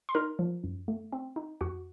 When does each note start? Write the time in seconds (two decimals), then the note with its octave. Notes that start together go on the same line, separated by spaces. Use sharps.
0.09 C6
0.15 D#4 A#4 A#5
0.39 F3
0.64 F#2
0.88 A3
1.13 C4
1.36 D#4
1.61 F2 F#4 F#5